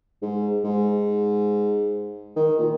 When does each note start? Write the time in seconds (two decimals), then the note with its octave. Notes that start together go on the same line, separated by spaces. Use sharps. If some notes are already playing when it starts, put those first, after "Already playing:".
0.22 G#2
0.64 G#2
2.36 D#3
2.59 A#2